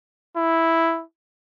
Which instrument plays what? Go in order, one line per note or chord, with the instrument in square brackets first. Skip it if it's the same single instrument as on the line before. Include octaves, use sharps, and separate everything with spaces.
[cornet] E4